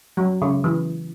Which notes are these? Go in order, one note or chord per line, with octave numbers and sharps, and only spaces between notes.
F#3
C#3
E3